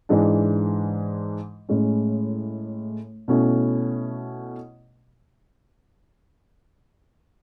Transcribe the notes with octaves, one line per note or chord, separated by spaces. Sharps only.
G#2 E3 G#3 D4
A2 G#3 C#4
B2 A3 C#4 E4